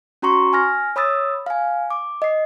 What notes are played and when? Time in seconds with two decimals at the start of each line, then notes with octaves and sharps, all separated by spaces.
0.22 C#4 F#4 A#5 C6 C#6
0.53 G#5 F6 A#6
0.96 C#5 B5 D#6 E6 A6
1.46 F5 G#5
1.90 D6
2.22 D#5 C7